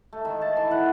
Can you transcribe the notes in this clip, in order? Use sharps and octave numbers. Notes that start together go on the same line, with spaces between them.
A3
D#3
A5
E3
F#5